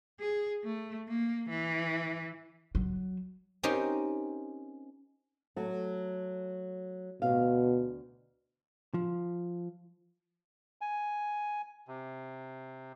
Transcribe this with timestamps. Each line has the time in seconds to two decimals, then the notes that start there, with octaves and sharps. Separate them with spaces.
0.20 G#4
0.64 A3
1.08 A#3
1.49 E3
2.75 F#3
3.63 C4 C#4 D#4 G4 A#4 C5
5.56 F#3 A3
7.22 D2 B2 F5
8.94 F3
10.81 G#5
11.88 C3